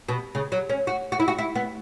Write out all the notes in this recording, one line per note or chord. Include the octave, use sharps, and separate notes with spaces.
B2
C#3
F#3
C#4
F#4
F#4
E4
F#4
E4
B3